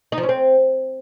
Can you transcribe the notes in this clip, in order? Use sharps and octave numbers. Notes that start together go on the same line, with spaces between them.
D#4
F3
C#4
C4